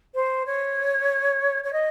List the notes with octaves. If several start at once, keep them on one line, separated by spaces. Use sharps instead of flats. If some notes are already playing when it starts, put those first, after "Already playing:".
C5
C#5
C#5
D#5